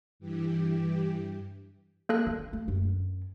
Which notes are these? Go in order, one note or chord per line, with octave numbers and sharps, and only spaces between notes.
G2 E3 G4
A#3 A4 F#6
D#3
A3
F#2